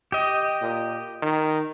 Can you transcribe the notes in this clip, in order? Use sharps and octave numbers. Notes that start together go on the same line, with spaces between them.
G4 D#5
A#2
D#3